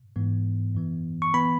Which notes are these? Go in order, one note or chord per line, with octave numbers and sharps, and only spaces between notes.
G#2 E3 B3
F#2 E3 B3
C#6
E3 B3 B5